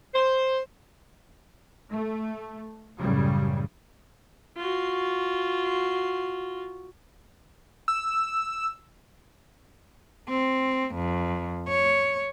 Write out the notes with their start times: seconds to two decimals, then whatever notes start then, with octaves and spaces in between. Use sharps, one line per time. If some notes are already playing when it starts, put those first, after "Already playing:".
0.14 C5
1.93 A3
2.99 A1 F#2 A2 C#3 G3
4.57 F4 F#4
7.88 E6
10.30 C4
10.95 F2
11.68 C#5